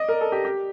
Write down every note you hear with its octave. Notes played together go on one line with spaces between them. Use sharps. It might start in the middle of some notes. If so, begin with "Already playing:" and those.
Already playing: D5 D#5
A#4
A4
G4
G4